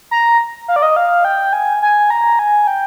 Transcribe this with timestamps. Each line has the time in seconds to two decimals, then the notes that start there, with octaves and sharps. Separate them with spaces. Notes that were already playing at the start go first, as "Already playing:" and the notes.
0.11 A#5
0.68 F5
0.76 D5
0.82 D#5
0.96 F5
1.25 G5
1.53 G#5
1.82 G#5
2.10 A#5
2.39 G#5
2.67 G5